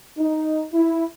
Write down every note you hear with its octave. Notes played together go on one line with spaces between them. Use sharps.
D#4
E4